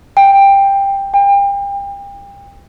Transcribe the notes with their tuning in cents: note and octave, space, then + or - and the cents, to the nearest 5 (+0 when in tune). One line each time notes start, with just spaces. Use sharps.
G5 +10
G5 +35